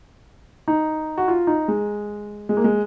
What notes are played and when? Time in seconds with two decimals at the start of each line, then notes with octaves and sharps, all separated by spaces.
0.68 D#4
1.18 F#4
1.28 F4
1.47 D#4
1.68 G#3
2.49 G#3
2.57 A#3
2.64 G#3